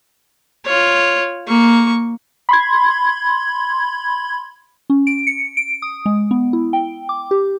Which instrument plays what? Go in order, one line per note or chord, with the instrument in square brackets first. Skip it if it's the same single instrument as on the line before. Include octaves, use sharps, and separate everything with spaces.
[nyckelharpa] F4 C#5
A#3 C#6
[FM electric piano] B5 C6 G#6
[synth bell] C#4
D7
C#7
D7
D#6
G#3
B3
E4
G5
D6
G4